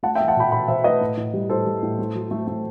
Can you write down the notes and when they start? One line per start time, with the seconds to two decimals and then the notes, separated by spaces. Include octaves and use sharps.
0.03 A3 F#5 A5
0.15 E5 G5
0.20 A3
0.28 F#5 A5
0.36 B2 G5 B5
0.52 B2 G5 B5
0.68 B2 C5 E5
0.84 A3 B4 D#5
1.01 A2
1.17 A2
1.33 G3
1.49 A2 A4 C5
1.66 G3
1.83 A2
1.99 A3
2.15 F#3
2.31 A3
2.48 A3